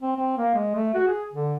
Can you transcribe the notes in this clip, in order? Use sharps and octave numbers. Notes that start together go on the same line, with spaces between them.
C4
C4
A#3
G#3
A3
F#4
G#4
D3